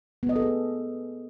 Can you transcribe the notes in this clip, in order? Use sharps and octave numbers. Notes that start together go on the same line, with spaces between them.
B3
D#5
A4
G#4